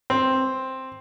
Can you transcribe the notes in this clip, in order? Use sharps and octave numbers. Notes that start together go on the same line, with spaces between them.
C4